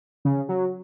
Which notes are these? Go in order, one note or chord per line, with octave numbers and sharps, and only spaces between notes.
C#3
F#3